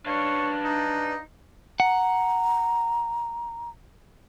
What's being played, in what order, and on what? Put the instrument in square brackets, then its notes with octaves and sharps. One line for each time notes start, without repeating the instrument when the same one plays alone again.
[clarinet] D4 [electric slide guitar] B4 D5 F5 [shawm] C#5
[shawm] D#4
[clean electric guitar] F#5 [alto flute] A#5